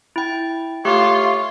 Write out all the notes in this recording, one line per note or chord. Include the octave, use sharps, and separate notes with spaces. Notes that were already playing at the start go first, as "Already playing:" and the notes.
E4 G5
A3 F4 G4 C#5